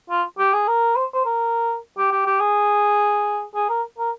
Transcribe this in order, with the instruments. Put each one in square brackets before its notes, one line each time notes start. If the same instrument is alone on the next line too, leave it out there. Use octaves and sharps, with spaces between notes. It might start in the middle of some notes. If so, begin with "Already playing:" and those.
[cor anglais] F4
G4
G#4
A#4
C5
C5
A#4
G4
G4
G4
G#4
G#4
A#4
A#4